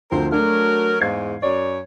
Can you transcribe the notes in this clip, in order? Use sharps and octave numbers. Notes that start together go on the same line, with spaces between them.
D2 F3 C4 A#4 C5
F#3 A3 D4 A#4
E2 G#2 F5 G#6 C7
F#2 C#5 D5